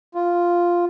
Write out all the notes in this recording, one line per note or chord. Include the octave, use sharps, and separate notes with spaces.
F4